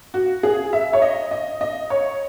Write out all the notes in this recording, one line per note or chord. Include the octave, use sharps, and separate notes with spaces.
F#4
G#4
E5
C#5
D#5
D#5
D#5
C#5